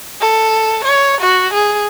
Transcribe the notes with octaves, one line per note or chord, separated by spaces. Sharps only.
A4
C#5
F#4
G#4